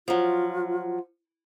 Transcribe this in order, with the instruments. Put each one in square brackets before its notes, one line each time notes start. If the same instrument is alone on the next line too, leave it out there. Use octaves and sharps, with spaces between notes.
[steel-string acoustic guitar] F3 F#3 [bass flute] F4